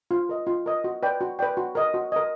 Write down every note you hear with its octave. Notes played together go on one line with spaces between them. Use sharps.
F4
A#4 D#5
F4
A#4 D#5
F#4
B4 D5 G5
F#4
B4 D5 G5
F#4
A#4 D#5
F#4
A#4 D#5